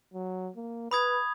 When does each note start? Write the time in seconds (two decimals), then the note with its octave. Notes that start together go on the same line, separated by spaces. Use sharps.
0.14 F#3
0.56 A#3
0.91 B4 B5 D#6 G#6